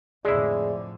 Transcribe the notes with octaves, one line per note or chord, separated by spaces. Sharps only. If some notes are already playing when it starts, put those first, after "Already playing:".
F2 A2 D3 G#3 E4 G#4 D5